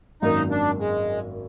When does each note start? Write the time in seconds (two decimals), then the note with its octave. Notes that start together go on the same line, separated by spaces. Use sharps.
0.22 G#1 F#2 D#3 A#3 D#4
0.51 D4
0.79 G#3